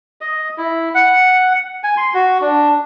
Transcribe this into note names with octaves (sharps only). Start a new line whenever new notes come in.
D#5
E4
F#5
G#5
C6
F#4
D4